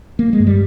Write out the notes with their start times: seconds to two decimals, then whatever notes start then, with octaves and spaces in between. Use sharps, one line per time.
0.19 A#3
0.33 G#3
0.40 G2
0.47 G3